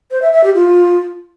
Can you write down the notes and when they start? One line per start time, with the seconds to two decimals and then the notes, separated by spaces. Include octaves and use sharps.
0.11 C5
0.22 E5
0.33 E5
0.44 G4
0.55 F4